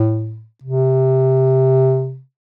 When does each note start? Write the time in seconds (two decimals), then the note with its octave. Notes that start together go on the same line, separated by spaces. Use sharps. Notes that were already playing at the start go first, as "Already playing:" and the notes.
Already playing: A2
0.64 C3